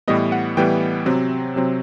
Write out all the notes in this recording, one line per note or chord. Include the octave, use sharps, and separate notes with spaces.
A2 E3 G3 B3 D#5
F#5
A2 E3 G3 B3 G5
C3 F#3 C4
C3 F#3 C4